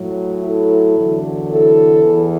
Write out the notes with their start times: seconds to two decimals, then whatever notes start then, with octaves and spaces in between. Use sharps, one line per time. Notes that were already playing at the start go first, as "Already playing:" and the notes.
Already playing: A2 F#3
0.44 E4 A4
0.97 E2 D3 F#3
1.50 E4 A4
2.02 E2 E3